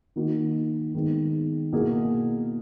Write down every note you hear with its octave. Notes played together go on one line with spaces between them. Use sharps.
D#3 A#3 D#4 F#4
D#3 G#3 B3
B2 A#3 E4 G#4